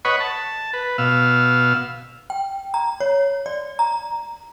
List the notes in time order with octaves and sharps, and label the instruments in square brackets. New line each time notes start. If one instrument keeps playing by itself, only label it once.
[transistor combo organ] B4 C#5 D#5 F#5 B5 C#6
A5
B4
B2 F5 E6
[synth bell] G5
A#5
C#5
D5
A#5